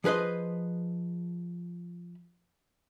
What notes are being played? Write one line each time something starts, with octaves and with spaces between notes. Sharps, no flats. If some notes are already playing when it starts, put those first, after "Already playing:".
F3 G#4 B4 C5 D#5